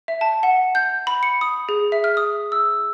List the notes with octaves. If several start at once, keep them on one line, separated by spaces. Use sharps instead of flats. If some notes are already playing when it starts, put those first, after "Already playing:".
E5
A5
F#5
G6
B5
C#7
D#6
G#4
E5
F6
D#6
E6